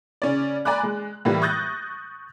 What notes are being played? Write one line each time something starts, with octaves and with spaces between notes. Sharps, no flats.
C#3 C#4 D5
D5 G#5 A#5 B5 D6 F#6
G#3
A2 E3 G3 A#3
C#6 D#6 F#6 G6 A6 A#6